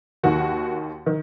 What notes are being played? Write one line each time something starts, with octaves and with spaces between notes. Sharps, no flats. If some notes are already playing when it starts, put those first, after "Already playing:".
D#2 D#3 F#4
D#3